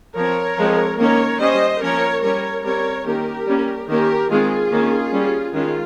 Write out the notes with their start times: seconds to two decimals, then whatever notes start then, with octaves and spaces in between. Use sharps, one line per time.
0.16 F3 C4 A#4 C#5
0.57 F3 G#3 C4
0.99 D#3 A#3 C#4 A#4 C#5
1.40 G3 C#4 C5 D#5
1.81 F3 A#3 C#4 A#4 C#5
2.22 G3 C#4 A#4 C#5
2.64 G3 C4 A#4 C#5
3.05 D#3 A#3 C#4 G4 A#4
3.47 G3 A#3 C#4
3.88 D#3 A#3 C#4 G4 A#4
4.30 D#3 G#3 C4 F4 G#4
4.71 D#3 A#3 C#4
5.12 G3 C#4
5.54 D#3 G#3 C#4 F4